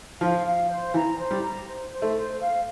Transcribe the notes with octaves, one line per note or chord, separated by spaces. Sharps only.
F3 F5
F5
C5
E3 A#5
C5
G3
A#5
C5
C5
A3
C5
F5